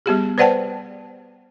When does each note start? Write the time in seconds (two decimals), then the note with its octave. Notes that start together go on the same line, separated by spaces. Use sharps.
0.06 G3 B3 G4 G#4
0.38 B4 C5 D5 F#5 G5 A5